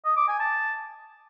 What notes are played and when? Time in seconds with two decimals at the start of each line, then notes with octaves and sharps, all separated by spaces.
0.05 D#5
0.17 D6
0.28 G#5
0.40 A5